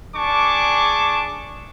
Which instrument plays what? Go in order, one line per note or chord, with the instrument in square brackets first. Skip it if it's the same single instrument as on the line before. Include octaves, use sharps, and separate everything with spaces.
[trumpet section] D4 G#4 A5 C#6 D6